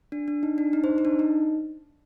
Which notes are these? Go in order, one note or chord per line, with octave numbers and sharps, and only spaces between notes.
D4
D4
D#4
D4
D#4
C5
D#4
D4
D#4